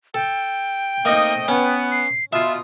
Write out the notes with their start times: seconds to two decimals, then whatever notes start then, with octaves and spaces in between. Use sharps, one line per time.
0.14 A4 G5
1.05 A3 A#3 C4 D#4 D#5
1.48 B3 C#4
1.92 C7
2.33 B2 F4 E5 D#6